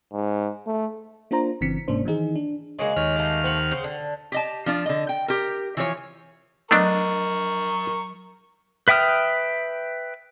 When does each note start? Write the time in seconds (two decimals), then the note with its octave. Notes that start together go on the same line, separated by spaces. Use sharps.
0.12 G#2
0.67 A3
1.31 A#3 D4 F4 C5 A#5
1.61 G1 C#3 E3 C4 B6 C#7
1.88 G#2 C3 A#3 C#4 D4 C5
2.05 D#3 E3 D#4 G#4
2.36 D4
2.79 C#3 F#3 G#3 A#3
2.96 D#2 C#5 F6
3.16 A3 A#3
3.44 C4 F#5
3.71 C#3 C5
3.84 D3
4.32 G4 D#5 A5
4.66 F3 D4 F4
4.86 D3 D#5
5.09 G5
5.28 G4 A#4
5.77 E3 F3 C#5 G#5
6.71 F#3 A3 B3 D4 A#4 D#5 C#6
8.88 B4 E5 G5 D#6 F6